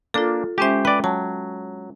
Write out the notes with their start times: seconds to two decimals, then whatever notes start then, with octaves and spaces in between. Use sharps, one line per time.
0.14 A#3 D4 F4 A4
0.58 G#3 C#4 G4 C5 E5
0.85 B4 D5 G5
1.04 F#3 A5